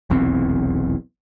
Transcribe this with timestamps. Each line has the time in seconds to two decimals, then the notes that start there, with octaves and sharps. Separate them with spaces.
0.10 F1 B1 E2 C4